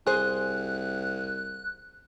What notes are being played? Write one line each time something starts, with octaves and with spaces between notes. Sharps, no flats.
C2 G#4 C5 F#6